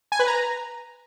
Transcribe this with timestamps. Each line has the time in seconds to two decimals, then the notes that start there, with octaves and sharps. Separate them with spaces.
0.12 G#5
0.19 B4
0.27 A#5